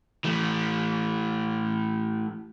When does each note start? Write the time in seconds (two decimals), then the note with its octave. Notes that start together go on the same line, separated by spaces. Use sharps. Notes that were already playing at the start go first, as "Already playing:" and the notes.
0.24 E3 A3